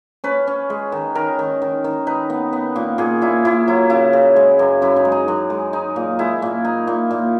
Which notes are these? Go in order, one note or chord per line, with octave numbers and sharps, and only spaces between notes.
C#4 B4
C#4
G#3
D#3
D#3 A#4
D#3
D#3
D#3
D#4 B4
B3
B3
A#2
A#2 G#4
A#2 E4
A#2 E4
F#3 E4
C#3 E4
C#3
G#3
F#2
F#2 E4
D#4
G#3
D#4
F#2
G#3
D#4
A#2
G#3 E4
A#2
D#4
A#2
A#2